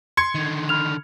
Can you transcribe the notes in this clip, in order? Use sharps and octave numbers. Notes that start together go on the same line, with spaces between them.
C6 G#6 C#7
D3 D#3
B5 F6 F7